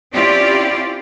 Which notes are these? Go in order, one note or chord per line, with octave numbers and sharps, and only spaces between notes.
C4 C#4 E4 F4 G4 D5